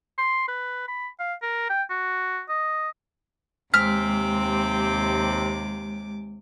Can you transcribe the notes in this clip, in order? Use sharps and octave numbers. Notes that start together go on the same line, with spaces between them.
C6
B4
B5
F5
A#4
G5
F#4
D#5
D#2 C3 G#3 C4 D6 F6